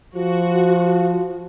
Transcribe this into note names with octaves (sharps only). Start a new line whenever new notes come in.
F3 F#4